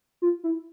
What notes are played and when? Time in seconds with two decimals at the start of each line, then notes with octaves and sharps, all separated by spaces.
0.22 F4
0.44 E4